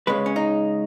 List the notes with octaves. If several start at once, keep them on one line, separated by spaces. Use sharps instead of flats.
C#3 G#3 B4
C#4
D#4